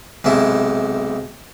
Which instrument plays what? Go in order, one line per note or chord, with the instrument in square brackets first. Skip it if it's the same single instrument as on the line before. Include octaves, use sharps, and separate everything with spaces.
[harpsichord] B1 G#2 C3 E4